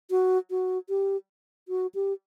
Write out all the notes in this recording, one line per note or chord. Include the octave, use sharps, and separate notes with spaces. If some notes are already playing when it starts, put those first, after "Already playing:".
F#4
F#4
G4
F#4
G4